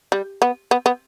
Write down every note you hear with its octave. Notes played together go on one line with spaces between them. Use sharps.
G3
B3
B3
B3